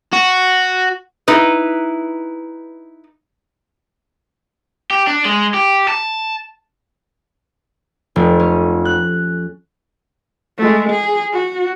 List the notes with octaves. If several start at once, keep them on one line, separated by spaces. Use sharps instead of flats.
F#4
D#4 E4 B4
G4
D4
G#3
G4
A5
F1
C#4
F#6
G#3 A3
G#4
F#4